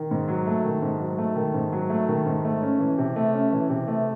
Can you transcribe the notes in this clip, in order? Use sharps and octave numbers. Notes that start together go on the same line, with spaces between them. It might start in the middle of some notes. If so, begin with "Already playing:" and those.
Already playing: D#3
G#2
F#3
A3
D#3
G#2
F#3
A3
D#3
G#2
F#3
A3
D#3
G#2
A3
C#4
E3
C3
A3
C#4
E3
C3
A3